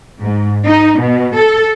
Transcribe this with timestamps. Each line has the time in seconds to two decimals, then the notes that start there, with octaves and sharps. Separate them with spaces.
0.20 G#2
0.65 D#4
0.99 B2
1.35 A4